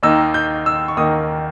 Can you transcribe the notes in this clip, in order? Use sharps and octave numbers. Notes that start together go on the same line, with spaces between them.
D#2 D#3 A#3 D#4 E6
G6
E6
C#6
D#2 D#3 A#3 D#4 D#6